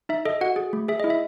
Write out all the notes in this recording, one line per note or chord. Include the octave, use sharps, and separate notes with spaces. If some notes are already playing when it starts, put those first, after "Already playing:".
D#4 E5
A4 D#5
F#4 F#5
G#4
A3
G#4 E5
E4 D#5
E5